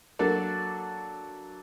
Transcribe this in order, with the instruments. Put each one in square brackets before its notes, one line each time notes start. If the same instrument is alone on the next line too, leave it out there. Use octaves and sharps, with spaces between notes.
[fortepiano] F#3 A#3 D4 F#4 A4 D5